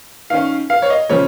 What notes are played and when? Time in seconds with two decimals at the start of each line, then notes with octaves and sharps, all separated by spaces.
0.30 D#3 C#4 F5
0.70 F5
0.82 C#5
0.90 D#5
1.09 C#3 F3 C#4 C#5